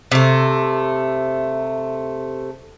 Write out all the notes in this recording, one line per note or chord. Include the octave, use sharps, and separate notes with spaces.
C3 A3